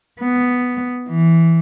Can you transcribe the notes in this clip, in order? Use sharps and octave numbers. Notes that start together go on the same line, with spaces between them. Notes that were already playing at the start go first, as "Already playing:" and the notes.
B3
E3